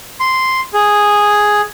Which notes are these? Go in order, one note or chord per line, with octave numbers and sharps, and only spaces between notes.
C6
G#4